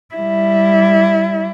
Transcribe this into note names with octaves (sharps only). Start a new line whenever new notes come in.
G3 E4